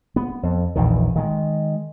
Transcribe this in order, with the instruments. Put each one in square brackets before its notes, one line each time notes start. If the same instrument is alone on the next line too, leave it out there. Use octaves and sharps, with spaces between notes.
[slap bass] B3
F2
A#1 E2 D#3
D#3 G#3